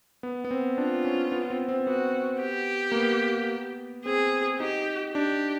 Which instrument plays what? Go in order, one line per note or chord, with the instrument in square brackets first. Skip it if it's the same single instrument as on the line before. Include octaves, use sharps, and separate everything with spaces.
[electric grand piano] B3
B3
C4
[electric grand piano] D4 [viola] F4
[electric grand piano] C#4
B3
C4
C4
[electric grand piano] B3 [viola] F#4
[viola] G4
[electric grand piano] A#3
B3
[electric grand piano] C4 [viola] G#4
[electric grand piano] D#4 [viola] G4
[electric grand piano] D4 [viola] G4